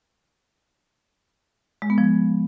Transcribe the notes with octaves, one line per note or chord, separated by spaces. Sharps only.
G#3
B3
F3